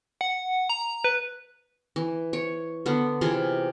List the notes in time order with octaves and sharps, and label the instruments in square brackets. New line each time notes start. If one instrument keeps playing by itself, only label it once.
[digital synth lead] F#5
A#5
B4
[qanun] E3
C#5
D3 B3
C3 E3 F4 G#4